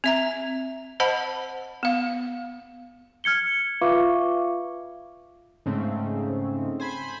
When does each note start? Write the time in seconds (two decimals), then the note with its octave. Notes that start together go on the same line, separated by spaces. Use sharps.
0.04 C4 E5 A#5
1.00 C5 D#5 F#5 A5 B5
1.83 B3 F5
3.24 F6 G#6 C#7 G7
3.81 F4 B4 E5 F5 C#6 D6
5.66 G#2 C#3 A3 C4
6.80 C5 G#5 B5